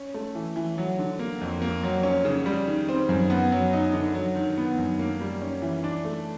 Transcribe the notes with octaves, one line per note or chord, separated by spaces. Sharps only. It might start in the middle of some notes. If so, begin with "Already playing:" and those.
Already playing: C#4
A3
E3
E3
F#3
D3
A#3
F2
A#3
F#3
C#4
C#3
G3
D#3
C4
F#2
B3
F#3
D#4
D3
F#3
D#3
B3
F#2
A#3
G3
C#4
E3
D4
A3